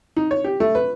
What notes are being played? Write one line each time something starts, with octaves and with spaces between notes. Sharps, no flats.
D#4
C#5
G4
A3
B4